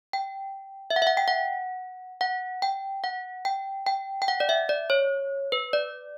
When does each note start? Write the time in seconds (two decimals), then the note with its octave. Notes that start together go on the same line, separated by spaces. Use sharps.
0.13 G5
0.90 E5
0.96 F#5
1.02 E5
1.07 F#5
1.17 G5
1.28 F#5
2.21 F#5
2.62 G5
3.04 F#5
3.45 G5
3.87 G5
4.22 G5
4.28 F#5
4.40 D5
4.49 E5
4.69 D5
4.90 C#5
5.52 B4
5.73 D5